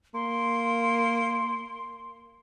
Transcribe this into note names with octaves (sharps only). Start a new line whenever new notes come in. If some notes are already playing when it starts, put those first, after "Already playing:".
A#3 C6